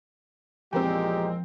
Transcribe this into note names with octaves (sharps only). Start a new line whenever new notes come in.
E2 A#2 F3 G#3 C4 G4 A#4 G5